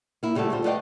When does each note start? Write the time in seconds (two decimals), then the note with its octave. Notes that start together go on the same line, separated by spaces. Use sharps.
0.23 A#3 E4
0.35 C#3 G3 A3 F#4 A4
0.51 D2 G3 F4 C5
0.65 A3 B4 D5 D#5 F5 G5